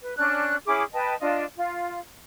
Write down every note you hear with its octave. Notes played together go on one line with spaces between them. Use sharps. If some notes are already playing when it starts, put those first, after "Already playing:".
B4
C#4 D4 F#6
C#4 E4 G#4 D6
B4 D#5 G5 A5
D4 F4 D#5
F4